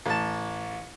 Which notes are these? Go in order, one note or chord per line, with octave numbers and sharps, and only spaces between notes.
A1 A5